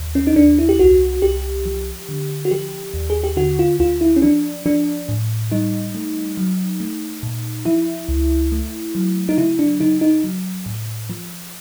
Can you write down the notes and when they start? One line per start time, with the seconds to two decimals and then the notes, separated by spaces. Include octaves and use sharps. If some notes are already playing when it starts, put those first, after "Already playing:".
Already playing: D#2
0.15 C#4
0.27 D#4
0.36 D#2 D4
0.58 E4
0.69 G4
0.79 C2 F#4
1.22 C2 G4
1.66 F3
2.09 D3
2.45 F#4
2.51 F3 G4
2.94 D#2
3.10 G#4
3.24 G4
3.37 D3 F#4
3.59 F4
3.80 D2 F4
4.01 E4
4.16 C#4
4.22 F3 D4
4.65 F3 D4
5.09 A2
5.52 G3 D#4
5.95 A3
6.37 F#3
6.80 A3
7.23 A#2
7.65 F3 E4
8.08 C#2
8.52 A3
8.95 F#3
9.29 D#4
9.38 C#3 E4
9.59 D4
9.80 C#3 D#4
10.01 D#4
10.24 F#3
10.66 A2
11.09 F3